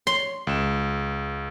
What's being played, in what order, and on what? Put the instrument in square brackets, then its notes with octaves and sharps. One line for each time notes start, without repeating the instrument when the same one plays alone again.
[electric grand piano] C#5 [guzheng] C6
[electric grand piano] C#2 E7